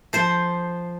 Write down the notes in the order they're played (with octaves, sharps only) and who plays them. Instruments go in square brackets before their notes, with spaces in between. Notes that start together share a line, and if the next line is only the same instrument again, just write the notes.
[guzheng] F3 C5